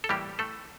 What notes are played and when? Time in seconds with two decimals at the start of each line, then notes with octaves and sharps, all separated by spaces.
0.04 A4
0.09 A2 E3 G3 A#3 G4
0.39 A3 A4